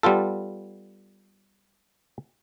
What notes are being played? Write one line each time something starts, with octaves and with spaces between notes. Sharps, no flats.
G3 B3 F4 A4